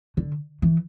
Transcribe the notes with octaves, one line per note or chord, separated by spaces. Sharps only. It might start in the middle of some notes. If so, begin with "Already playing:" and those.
D3
E3